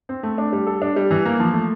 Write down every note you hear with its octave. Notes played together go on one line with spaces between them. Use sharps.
C4
A3
D4
G3
A4
D4
G3
E3
A#3
F3
A3